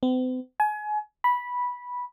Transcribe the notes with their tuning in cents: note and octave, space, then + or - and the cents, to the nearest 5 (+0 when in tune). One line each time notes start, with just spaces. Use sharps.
C4 -45
G#5 +30
B5 -10